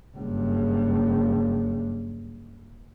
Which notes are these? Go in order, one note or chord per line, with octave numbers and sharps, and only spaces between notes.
F#1 G2